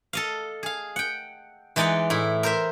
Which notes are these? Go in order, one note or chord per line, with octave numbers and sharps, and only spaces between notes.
A4 D#5 F5
G#4 F5
F#5 G5
E3 G#3 D#4 D5 D#5 F#5
A2 E4
A#4 C5 E5